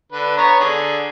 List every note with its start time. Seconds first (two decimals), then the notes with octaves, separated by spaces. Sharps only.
0.12 D3 B4
0.37 B3 C#5 A#5
0.60 D3 G#4